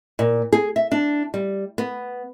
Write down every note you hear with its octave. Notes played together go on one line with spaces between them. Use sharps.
A#2
G#4
E5
D4
G3
B3